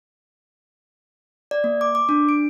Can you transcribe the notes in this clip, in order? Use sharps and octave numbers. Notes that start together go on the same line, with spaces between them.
D5
A#3
D6
D6
D4
D7